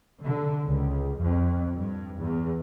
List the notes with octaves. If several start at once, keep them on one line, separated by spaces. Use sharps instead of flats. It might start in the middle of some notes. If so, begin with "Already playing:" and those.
D3
C#2
F2
G2
E2